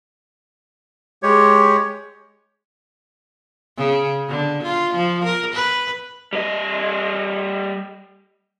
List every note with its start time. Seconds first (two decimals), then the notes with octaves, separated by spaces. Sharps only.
1.23 G#3 G4 C#5
3.77 C#3
4.28 D3
4.63 F4
4.94 F3
5.24 A#4
5.54 B4
6.33 G3 D#5